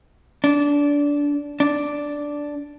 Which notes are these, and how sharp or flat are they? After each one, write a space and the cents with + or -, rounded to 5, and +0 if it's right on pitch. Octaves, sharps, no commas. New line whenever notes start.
D4 -20
D4 -5